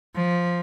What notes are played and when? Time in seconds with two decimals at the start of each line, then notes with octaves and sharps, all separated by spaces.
0.15 F3